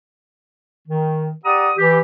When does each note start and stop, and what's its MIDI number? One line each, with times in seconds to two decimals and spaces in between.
0.88 1.31 51
1.45 1.70 67
1.45 1.70 74
1.45 1.70 78
1.45 1.70 82
1.45 1.70 87
1.78 1.99 52
1.78 1.99 67